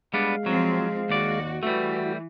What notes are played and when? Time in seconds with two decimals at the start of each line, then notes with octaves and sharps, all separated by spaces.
0.14 G3 G#3 B3 D4 F5
0.46 F3 F#3 C4
1.09 D#2 F#4 D5
1.63 E3 G3 A3 F#4